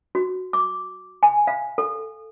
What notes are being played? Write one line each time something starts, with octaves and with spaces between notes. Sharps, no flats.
F#4
D6
G#5
F5
A4